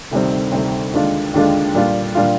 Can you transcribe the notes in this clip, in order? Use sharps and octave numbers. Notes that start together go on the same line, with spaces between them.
D2 C3 D#3 G3 C4
D2 C3 D#3 G3 C4
D#2 D3 G#3 D4 F4
D#2 D3 G#3 D4 F4
A#2 G3 D4 F4
A#2 G3 D4 F4